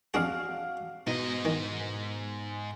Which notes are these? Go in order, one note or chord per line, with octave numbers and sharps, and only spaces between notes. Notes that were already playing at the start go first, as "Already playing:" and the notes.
F2 D4 F#4 G#4 F5
G#2 B2 D#4 D#5
D#3